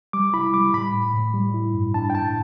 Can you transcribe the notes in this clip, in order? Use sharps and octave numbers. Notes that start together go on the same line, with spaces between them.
G3 D6
E4 B5
G3 D6
A2 B5
A2
A2
G3
E4
G2
D4 A5
G5
A2 A5